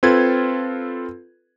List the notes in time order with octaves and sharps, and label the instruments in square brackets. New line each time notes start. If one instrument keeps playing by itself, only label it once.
[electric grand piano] C4 F4 A4 B4 G#6